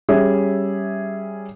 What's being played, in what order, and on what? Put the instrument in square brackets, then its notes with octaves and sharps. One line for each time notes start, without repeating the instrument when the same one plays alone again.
[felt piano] G3 C#4 G#4 E5